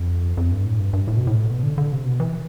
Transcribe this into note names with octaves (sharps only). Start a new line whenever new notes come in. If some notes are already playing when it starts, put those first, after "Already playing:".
Already playing: F2
F2
G2
A2
G2
G2
A2
B2
A2
B2
D3
D3
C3
B2
E3